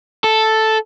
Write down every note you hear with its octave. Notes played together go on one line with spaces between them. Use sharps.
A4